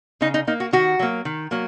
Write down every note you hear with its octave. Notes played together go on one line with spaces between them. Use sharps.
C#3 D#4
D#4
A#3 D#4
F#4
D#3 F#4
F#3 A#3
D#3
F#3 A#3